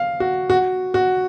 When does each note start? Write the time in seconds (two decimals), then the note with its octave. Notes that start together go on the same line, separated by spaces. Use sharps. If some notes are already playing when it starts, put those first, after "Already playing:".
Already playing: F5
0.20 F#4
0.50 F#4
0.94 F#4